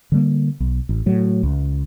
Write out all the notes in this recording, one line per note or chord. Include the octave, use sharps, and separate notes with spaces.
D3 G3 A#3
B1
A1
A2 F#3
C#2